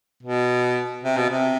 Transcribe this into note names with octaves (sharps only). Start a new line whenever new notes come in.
B2
C3
B2
C3